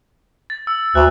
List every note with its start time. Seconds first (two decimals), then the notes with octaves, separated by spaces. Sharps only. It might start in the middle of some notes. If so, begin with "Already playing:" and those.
0.50 A6
0.67 E6
0.95 D2 F#6